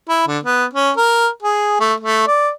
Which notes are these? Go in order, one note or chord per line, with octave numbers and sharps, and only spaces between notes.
E4
D3
B3
C#4
A#4
G#4
A3
A3
D5